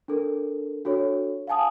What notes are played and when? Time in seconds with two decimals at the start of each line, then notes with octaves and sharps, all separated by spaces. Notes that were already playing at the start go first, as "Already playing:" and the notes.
0.08 D4 A4 A#4
0.85 D4 F#4 A4 C#5
1.47 F5 F#5 G#5 A5 D#6